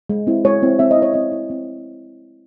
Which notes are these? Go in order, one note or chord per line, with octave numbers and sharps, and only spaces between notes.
G#3
C4 E4
G#3 C#5
C4 E4
C4 E5
D#5
E4
C#5
C4 D#5
E4
C4